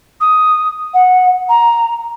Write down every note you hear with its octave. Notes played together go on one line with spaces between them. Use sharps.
D#6
F#5
A#5